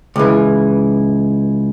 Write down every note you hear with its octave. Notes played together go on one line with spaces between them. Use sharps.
C#2 E3